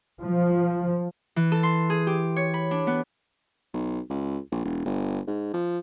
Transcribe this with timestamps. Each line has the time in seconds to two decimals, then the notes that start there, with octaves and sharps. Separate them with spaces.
0.22 F3
1.36 E3
1.52 A4
1.63 C6
1.90 G#4
2.07 G4
2.36 C#5
2.54 B5
2.71 D4
2.87 B3
3.74 B1
4.10 C#2
4.52 A#1
4.65 E1
4.85 G1
5.28 G#2
5.54 F3